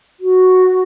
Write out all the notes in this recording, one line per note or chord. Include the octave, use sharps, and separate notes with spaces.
F#4